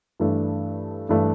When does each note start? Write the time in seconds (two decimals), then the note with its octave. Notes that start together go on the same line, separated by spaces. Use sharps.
0.20 G2 E3 A3 D4
1.09 G2 E3 A3 D4